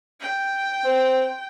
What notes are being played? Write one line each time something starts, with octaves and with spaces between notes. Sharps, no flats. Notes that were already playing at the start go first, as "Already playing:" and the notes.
G5
C4